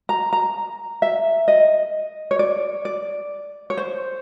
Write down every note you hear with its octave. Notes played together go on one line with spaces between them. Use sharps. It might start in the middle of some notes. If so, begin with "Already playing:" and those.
A#5
A#5
E5
D#5
C#5
D5
D5
C#5
C5